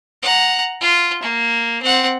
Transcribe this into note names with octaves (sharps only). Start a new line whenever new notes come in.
F#5 A#5
F4
A#3
C4 F#5